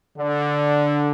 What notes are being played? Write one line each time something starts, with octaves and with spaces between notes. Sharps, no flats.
D3